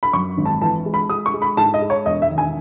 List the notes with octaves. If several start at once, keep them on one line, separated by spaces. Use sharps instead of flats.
B5
F#2 C#6
G#1
A5
E3 A5
G#3
B5
G#3 D#6
C#6
G#3
B5
G#2 A5
D#5
G#3
C#5
E1 D#5
E5
D#3
G#5